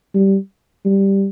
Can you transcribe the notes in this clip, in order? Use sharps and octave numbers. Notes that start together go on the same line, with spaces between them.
G3
G3